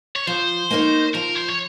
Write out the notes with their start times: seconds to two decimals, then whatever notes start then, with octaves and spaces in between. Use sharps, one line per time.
0.16 C#5
0.27 F3 C5
0.71 A#3 D#4 A#4 C#5
1.15 F3 A#4
1.36 C5
1.50 C#5